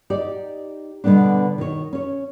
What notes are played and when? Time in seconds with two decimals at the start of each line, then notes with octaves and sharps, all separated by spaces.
0.10 D#4 G4 D5
1.04 B2 D3 G3 B3 D4
1.58 D#3 C#5
1.93 C#4 C#5